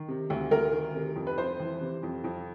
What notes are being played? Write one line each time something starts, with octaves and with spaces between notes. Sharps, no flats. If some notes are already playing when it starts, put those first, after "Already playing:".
Already playing: D#3
C3
D2
D2 A#4
D#3
C3
F2
B4
F2 C5
E3
C3
F2
F2